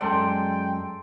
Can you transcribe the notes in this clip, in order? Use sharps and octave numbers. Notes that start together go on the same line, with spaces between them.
F#2 G#3 A4 D5 G5 A#5 C6